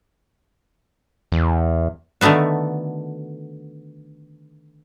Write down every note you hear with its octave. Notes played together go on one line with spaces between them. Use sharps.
E2
D3 D#3 A3 B3 F#4